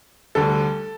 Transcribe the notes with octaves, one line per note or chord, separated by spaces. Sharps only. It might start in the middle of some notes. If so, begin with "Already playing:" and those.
D2 D3 G3 A4